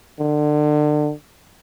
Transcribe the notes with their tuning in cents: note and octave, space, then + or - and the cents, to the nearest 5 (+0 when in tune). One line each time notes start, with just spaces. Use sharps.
D3 +30